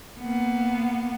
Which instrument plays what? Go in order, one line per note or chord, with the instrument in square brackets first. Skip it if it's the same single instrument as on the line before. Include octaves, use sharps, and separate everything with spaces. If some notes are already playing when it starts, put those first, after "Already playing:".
[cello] A#3 B3